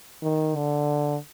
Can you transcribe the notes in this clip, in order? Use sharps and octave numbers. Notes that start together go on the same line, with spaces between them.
D#3
D3